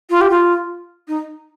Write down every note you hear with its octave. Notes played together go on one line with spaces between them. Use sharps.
F4
G4
F4
D#4